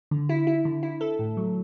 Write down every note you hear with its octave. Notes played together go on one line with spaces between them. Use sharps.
D3
E4
E4
D3
E4
A4
A2
F#3